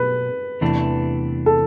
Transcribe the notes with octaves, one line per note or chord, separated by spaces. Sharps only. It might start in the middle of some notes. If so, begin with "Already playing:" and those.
Already playing: B2 F#3 A3 B4
E2 C3 E3 A3 D4
A4